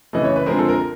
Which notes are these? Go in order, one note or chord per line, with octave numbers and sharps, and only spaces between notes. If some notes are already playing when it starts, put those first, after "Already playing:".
C#3 E3 A3 D#5
C#5
B4
D3 F3 G#3 C4 A#4
A4
A#4